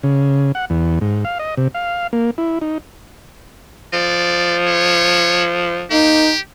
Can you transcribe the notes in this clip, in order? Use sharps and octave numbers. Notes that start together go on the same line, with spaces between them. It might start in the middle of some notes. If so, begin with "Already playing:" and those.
C#3
F#5
E2
G#2
F5
D#5
C3
F5
A#3
E4
D#4
F3 D5
C#5
A#3 D#4 G4